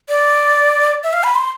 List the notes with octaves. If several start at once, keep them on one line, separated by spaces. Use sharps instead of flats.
D5
E5
F5
B5
C6